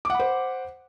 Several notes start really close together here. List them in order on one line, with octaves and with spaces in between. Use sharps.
D6 F#5 B5 C5